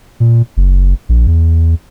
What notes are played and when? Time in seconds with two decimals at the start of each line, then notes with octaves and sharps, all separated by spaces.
0.20 A#2
0.57 F#1
1.09 A#1
1.27 E2